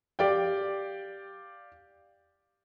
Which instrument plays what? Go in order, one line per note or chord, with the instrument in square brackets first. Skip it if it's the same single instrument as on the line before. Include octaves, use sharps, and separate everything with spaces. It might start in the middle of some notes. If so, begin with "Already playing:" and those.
[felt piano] G4 D5 F5 G5